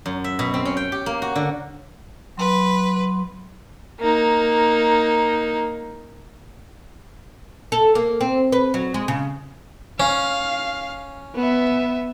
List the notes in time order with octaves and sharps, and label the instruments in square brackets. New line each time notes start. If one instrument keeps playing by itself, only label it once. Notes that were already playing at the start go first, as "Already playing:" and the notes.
[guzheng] F#2
E5
B2
C4
C#4
G5
G4
A#3
F#4
D3
[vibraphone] F#3 C6 [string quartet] B4
[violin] A#3 D#4
[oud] A4
A#3
C4
B4
F#3
G#3
C#3
[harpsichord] C#4 [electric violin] F5
[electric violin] B3 E5